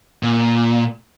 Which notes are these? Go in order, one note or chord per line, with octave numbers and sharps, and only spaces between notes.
A#2